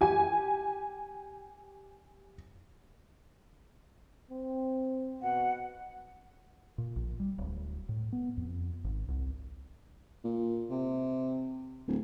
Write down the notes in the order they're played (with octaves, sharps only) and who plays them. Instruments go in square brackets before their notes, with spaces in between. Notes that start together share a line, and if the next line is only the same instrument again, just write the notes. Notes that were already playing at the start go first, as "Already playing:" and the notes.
[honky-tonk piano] G4 G#5
[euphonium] C4
[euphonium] B2 [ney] F#5
[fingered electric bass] A#2
A#1
G3
D1
A2
B3
F2
G#1
C2
[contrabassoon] A#2
C3
D1